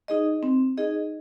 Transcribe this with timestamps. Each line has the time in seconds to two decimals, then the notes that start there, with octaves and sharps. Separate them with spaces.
0.08 D#4 G#4 D#5
0.43 C4
0.77 D#4 G#4 D#5